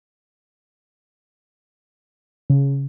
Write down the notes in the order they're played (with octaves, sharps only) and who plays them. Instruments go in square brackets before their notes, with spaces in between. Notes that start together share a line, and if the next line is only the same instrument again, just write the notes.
[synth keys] C#3